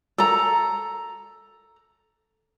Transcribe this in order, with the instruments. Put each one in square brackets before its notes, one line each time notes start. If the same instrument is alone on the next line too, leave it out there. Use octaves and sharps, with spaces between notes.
[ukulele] A4 A#5